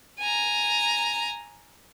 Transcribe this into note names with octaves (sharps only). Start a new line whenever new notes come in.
G#5 A#5